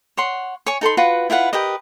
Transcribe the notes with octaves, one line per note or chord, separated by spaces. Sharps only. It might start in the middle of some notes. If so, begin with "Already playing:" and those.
C#5 F#5 C6
C#5 G#5 C#6
D#4 A4 B5 C6
F4 F#4 B4 F#5
E4 F4 B4 F#5
G4 A#4 B4 D#5